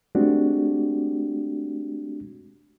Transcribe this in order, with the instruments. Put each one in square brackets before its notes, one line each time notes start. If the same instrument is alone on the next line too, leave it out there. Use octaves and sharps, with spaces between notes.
[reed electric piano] G#3 A3 C4 D4 F#4 G4